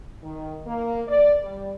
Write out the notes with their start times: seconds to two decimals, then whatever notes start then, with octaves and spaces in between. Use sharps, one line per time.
0.22 D#3
0.67 A#3
1.08 D5
1.42 G3